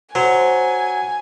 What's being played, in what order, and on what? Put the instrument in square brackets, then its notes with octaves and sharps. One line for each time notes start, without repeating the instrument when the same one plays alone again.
[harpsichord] F#3 [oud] C5 [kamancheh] G#5